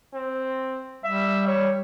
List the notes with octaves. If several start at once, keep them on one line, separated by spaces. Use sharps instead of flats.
C4
G3 E5
C#5